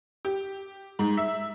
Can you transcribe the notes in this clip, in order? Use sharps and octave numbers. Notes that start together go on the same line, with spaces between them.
G4
G#2
E5